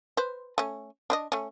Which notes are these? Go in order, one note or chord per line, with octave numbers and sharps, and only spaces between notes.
B4 C5
A3 C#4
D4 B4 D#5
A3 C#4